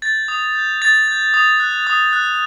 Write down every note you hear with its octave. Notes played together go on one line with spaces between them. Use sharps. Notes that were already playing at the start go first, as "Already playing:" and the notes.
G6 A6
D#6
G6
D#6 A6
G6
D#6
F#6
D#6
F#6